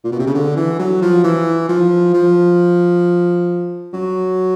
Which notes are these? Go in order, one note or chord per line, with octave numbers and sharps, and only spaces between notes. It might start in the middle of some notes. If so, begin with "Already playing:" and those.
A#2
B2
C3
C#3
D3
E3
F#3
F3
E3
F3
F3
F#3